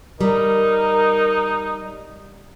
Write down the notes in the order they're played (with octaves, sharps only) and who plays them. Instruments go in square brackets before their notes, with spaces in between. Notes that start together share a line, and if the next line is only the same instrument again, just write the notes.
[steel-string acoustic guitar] G3 [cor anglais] D#4 [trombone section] A#4